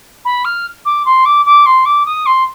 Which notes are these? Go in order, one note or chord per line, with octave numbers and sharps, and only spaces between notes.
B5
F6
D6
C6
D6
D6
C6
D6
D#6
C6